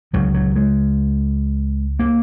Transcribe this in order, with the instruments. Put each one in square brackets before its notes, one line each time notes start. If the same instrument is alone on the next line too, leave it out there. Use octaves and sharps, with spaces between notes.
[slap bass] C#2 C#3 F#3
F#3
G#3
A#3